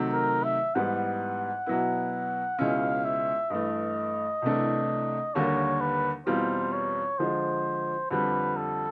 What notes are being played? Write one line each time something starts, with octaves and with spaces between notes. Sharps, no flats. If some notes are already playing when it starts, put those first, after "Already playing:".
Already playing: C3 D#3 F#3 A3
A#4
E5
G#2 E3 G3 B3 F#5
B2 F#3 B3 E4
C#2 B2 G#3 C#4 E4 F5
E5
G2 E3 A3 D#5
C2 C3 E3 A3 D4
D#2 D3 G3 A#3 C#5
B4
E2 B2 G3 C4 F4 C5
C#5
D3 F3 G#3 C5
F2 D3 G3 B4
A4